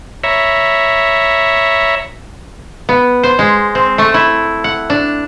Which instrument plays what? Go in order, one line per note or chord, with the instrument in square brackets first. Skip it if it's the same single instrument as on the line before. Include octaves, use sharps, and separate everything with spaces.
[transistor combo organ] C#5 E5 A#5 B5
[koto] B3
C5
G#3
C4
A3
E4
F#5
D4